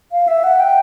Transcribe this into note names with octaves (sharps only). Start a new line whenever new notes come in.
F5
E5
F#5
G5